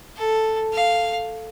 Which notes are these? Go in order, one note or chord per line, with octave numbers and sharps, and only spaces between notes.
A4
F5